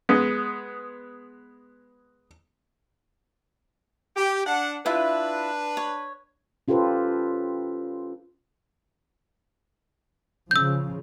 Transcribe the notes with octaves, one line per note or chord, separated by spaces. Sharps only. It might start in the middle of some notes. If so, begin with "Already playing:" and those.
G#3 B3
G4
D4 F#5
D4 E4 F4 B4 E5
C#5
C#4 F4 G4 A4 B4 C5
C#3 F3 E6 G6